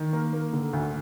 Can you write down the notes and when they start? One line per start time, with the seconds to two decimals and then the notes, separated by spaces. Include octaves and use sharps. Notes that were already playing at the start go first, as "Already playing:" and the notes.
Already playing: D#3
0.13 A#3
0.33 A#3
0.53 D3
0.73 D2